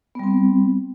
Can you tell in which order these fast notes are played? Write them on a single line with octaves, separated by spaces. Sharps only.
B3 G3 C4